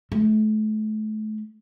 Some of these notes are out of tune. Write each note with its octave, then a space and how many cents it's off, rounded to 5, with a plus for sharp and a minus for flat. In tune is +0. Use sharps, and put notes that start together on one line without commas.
A3 -35